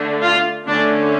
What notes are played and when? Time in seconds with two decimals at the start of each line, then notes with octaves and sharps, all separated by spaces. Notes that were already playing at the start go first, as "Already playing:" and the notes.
Already playing: D3 A3 D4
0.23 F4
0.67 D3 A3 C#4 D4